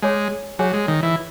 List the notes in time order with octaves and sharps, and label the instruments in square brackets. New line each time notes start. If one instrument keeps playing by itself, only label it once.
[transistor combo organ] G#3 [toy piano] G#4 C#5 G#5
[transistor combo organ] F#3 [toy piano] G#4 C#5 G#5
[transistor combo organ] G#3
D#3
E3